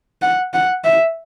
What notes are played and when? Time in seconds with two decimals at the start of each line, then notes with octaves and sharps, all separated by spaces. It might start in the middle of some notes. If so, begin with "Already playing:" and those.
0.22 F#5
0.54 F#5
0.85 E5